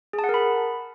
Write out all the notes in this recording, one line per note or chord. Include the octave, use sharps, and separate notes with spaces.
G#4
A5
F#5
A#4
B5